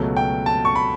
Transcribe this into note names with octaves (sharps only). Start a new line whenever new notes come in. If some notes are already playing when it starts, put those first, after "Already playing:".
Already playing: C#2 B2 F#3 A3
G5
A5
C#6
B5